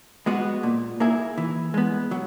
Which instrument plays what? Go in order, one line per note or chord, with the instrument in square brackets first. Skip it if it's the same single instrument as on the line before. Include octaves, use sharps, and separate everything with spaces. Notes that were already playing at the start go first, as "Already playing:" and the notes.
[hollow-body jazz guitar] G#3 B3 F#4
A#2
A#3 E4 G#4
E3
G#3 B3
F#3